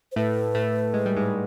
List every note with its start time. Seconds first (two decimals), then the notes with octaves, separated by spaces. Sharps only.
0.12 C5
0.16 A2 A3 B4
0.55 A2 A3
0.94 G#3
1.06 G3
1.17 G#2 G#3